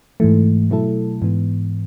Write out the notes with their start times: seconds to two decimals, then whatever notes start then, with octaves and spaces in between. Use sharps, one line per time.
0.20 G#2 E3 A3
0.70 B2 F#3 A3 E4 A4
1.22 G#2 E3 B3